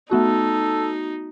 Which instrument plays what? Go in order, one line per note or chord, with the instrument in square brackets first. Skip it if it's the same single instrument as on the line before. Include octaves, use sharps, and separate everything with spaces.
[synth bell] A3 B3 F#4 [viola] D#4 [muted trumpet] A4